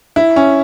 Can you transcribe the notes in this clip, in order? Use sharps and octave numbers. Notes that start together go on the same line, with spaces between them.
E4
C#4